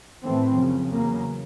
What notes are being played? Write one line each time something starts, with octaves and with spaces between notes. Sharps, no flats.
A2 E3 A3 C4
F#2 C#3 F3
E2 C#3 F#3 A#3